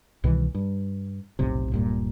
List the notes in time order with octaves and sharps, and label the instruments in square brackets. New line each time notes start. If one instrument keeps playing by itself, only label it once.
[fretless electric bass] C2 B2 D#3 E3
G2
F1 B1 A2 C3
D1 G2 A#2